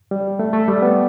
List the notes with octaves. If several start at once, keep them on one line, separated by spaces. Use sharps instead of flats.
G3
A3
A3
G3
B3